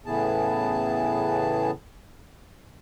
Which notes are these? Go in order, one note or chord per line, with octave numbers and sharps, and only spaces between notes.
A2 C#3 E3 B3 G#4 A5